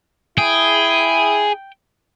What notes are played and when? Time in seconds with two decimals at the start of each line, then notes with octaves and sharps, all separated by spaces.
0.38 E4 G#4 G5